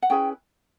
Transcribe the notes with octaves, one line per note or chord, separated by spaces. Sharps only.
F#5
C#4 E4 G#4 B4 G5